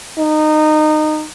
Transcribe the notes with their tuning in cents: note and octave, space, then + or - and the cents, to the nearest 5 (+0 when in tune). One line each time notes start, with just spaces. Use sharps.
D#4 -20